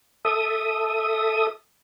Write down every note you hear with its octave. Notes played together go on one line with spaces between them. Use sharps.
A4 E5 D#6